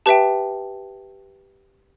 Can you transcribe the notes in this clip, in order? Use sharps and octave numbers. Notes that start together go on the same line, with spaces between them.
G4 B4 E5 G5 A5